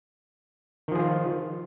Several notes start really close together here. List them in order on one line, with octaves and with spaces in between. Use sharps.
D#3 F3 G#4 F4